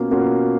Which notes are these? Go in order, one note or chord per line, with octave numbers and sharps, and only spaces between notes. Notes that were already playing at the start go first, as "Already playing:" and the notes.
Already playing: B2 A#3 C#4 F4
B2 A#3 C#4 F4